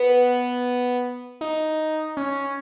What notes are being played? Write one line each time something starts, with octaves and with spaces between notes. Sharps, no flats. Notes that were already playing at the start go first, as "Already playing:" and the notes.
Already playing: B3
D#4
C#4